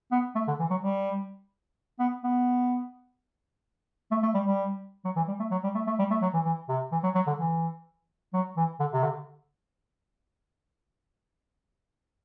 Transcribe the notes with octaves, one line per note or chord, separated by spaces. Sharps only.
B3
A3
D3
E3
F#3
G3
B3
B3
A3
A3
G3
G3
F#3
E3
G3
A3
F#3
G3
A3
A3
G3
A3
F#3
E3
E3
C3
E3
F#3
F#3
D3
E3
F#3
E3
D3
C3
D3